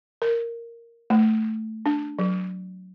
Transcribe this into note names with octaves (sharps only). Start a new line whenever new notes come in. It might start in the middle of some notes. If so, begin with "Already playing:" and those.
A#4
A3
D4
F#3